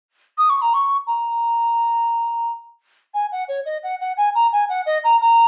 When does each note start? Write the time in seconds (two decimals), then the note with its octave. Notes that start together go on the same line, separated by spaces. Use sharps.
0.38 D#6
0.50 C#6
0.62 A#5
0.74 C#6
1.07 A#5
3.14 G#5
3.32 F#5
3.48 C#5
3.66 D#5
3.83 F#5
4.01 F#5
4.17 G#5
4.35 A#5
4.53 G#5
4.69 F#5
4.86 D#5
5.04 A#5
5.21 A#5